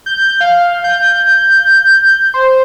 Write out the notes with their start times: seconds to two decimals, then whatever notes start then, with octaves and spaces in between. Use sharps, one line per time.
0.06 G6
0.41 F5
0.84 G6
2.34 C5